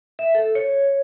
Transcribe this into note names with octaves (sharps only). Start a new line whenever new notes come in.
E5
A4
C#5